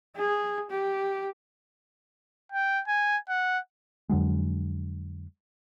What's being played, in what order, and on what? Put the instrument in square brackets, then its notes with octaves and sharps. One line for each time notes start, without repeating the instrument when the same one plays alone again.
[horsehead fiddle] G#4
G4
[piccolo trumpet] G5
G#5
F#5
[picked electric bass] F2 D3 F#3 G#3